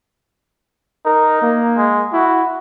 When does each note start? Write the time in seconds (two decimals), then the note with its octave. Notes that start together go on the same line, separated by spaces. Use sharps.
1.05 D#4 A#4
1.42 A#3
1.77 G#3
2.13 E4 F#4